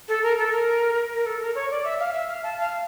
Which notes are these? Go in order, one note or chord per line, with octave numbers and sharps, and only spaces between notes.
A4
A#4
A4
A#4
A#4
A4
A#4
C#5
D5
E5
F5
E5
F5
A5
F5